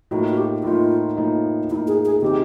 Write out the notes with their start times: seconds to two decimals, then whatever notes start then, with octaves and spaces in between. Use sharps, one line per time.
0.11 A2 F3 A#3 D#4 F#4
0.28 F#4
0.37 G4
0.64 A2 F3 A#3 D#4 F4
1.17 A2 F3 A#3 D#4
1.69 A2 F3 A#3 D#4 E4
1.87 G#4
2.05 G#4
2.22 C3 D#3 G#3 C4 D#4 G4